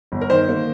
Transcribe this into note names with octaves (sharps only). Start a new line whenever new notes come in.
G1
A#4
D#3 C5
A#3